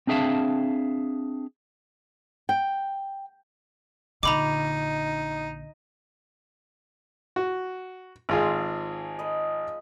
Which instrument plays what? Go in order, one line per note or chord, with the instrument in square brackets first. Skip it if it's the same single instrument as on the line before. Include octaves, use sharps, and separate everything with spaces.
[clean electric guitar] C4 D4 G#4 E5 F5 A5
[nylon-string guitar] G5
[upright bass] A#1 D3 [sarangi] D#4 [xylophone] A#5 B5 D6
[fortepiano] F#4
[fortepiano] G#1 F4 G#4 [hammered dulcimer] F3 G#3
[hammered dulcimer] D#5 B5